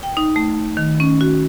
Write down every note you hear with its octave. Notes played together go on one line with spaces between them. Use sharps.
G5
D#4
A3
D#3
C#4
F#4